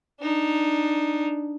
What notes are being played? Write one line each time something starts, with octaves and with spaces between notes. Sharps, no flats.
D4 D#4